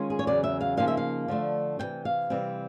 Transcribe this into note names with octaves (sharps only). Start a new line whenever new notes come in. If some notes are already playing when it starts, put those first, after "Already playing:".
Already playing: D#3 G#3 C#4 F4
G#4
C#5
E2 C#3 F#3 D5
E5
F5
C#3 F3 A#3 D#4 F5
E5
F5
D3 F3 A3 D4
E2 C3 E3 G5
F5
C3 E3 G3 C4